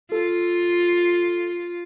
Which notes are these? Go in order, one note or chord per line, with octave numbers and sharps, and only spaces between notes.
F4 A4